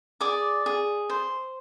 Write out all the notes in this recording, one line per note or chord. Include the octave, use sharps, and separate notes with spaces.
G#4 D5 D6
G#4
C5